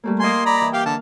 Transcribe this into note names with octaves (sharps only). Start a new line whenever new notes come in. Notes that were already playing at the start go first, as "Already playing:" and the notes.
G3 A3 A#3
A#3 D#5 G#5 C6
D5 A#5 B5
E3
G4 F5 G5
D3 F5 A5